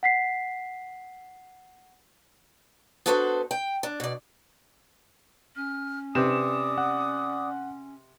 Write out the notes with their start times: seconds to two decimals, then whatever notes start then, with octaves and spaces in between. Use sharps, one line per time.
0.03 F#5 B6 C7
3.06 B3 D4 F#4 A4 B4 C5
3.51 G5
3.83 D4
4.00 B2 D5
5.56 C#4 F6
6.15 C3 B4 D5 D6 D#6 E7
6.78 F#5